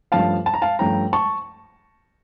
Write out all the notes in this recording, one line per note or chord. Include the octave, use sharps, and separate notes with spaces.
G2 F3 A3 C#4 F5 A5
A5
A#5
F5 A5
G2 F3 A3 C#4 G5 A#5
A5 C#6